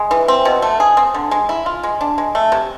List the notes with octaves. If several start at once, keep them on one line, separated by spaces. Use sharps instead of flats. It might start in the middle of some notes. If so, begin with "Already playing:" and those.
Already playing: G#3
E3
C4
B2
A3
G#4
C4
D3
G#3
E4
F4
G#3
D4
G#3
A3
C3